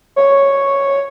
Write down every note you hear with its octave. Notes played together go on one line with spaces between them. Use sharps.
C#5